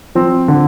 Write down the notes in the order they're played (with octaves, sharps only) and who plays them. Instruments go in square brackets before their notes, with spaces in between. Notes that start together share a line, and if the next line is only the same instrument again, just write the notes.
[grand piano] F3 C4
D3